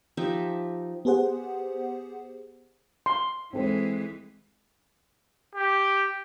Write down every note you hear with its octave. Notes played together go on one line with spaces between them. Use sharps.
F3 D#4 G4 E5
B3 G4 G#4 C5 F#5
C6
E3 G#3 C4 A4 C5
G4